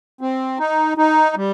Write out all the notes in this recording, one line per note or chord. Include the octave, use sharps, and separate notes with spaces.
C4
D#4
D#4
G3